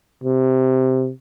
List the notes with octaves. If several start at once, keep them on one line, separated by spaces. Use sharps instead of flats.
C3